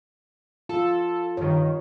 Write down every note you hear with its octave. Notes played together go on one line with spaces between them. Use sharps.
F4 A4
G2 D#3 C#5